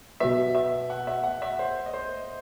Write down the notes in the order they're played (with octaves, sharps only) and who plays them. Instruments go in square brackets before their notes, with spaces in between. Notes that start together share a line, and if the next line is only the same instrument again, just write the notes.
[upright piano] B2 F#3 B3 [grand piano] E5
[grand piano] E5
F#5
E5
F#5
E5
C5
D#5
C5